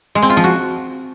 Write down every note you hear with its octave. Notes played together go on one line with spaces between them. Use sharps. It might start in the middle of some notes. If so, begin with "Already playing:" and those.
G#3
C4
F4
F3
F#4